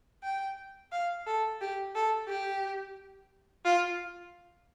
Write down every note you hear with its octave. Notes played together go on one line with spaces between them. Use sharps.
G5
F5
A4
G4
A4
G4
F4